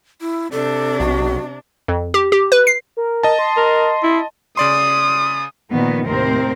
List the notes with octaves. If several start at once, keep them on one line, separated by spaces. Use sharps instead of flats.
E4
C3 D4 A4
B1 F#4
F2
G4
G4
B4
C7
A#4
D#5 A5
C6
A#4
E4
C#3 D5 C6 D#6
A#2 D#3 F3 B3
D#2 A2 C3 C4 A#4 C5